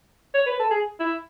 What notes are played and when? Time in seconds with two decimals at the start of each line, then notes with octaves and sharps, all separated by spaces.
0.34 C#5
0.46 B4
0.59 A4
0.71 G#4
1.00 E4